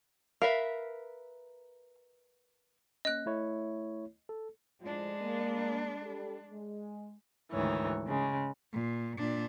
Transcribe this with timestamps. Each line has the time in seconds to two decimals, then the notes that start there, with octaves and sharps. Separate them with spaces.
0.42 A#4 B4 E5 F5
3.05 A#3 C#4 D#5 F#6
3.26 A3 E4 C#5
4.29 A4
4.81 A2 F3 G#3 D4
5.22 A#3
6.02 G3 A4
6.50 G#3
7.52 D2 G#2 D#3 E3 C#5
8.08 C#3 G#3
8.73 A#2
9.18 A#2 D4